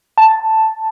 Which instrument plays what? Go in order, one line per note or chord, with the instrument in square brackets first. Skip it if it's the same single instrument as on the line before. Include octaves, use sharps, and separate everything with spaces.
[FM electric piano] A5